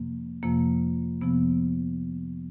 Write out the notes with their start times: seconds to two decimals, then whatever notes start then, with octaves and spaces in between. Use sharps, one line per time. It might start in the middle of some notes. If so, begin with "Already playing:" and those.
Already playing: F2 C3 F3 A#3
0.43 F2 C3 F3 A#3
1.21 F2 C3 F3 B3